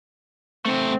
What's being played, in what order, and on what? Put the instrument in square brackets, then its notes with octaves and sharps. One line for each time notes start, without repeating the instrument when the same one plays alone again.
[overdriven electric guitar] A3 C5 [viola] C4